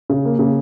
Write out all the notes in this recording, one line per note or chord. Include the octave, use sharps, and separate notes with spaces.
C#3
A#3
C#3